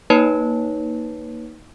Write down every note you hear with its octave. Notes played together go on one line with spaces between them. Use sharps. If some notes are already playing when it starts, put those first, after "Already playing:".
A#3 D#4 B4 C#5 A5